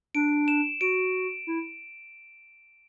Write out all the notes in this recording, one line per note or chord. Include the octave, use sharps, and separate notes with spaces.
D4 D7
E7
F#4 D7
E4